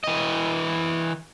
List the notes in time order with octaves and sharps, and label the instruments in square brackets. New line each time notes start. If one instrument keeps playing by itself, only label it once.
[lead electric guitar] E3 D#5